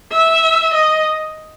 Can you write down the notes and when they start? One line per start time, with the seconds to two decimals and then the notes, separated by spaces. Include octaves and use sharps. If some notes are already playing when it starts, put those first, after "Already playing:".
0.12 E5
0.74 D#5